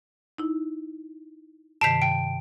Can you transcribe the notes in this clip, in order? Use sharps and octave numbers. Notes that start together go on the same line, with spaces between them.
D#4 E4
G2 C3 D#3 A5 B6 C7 D7 F7
G5 D7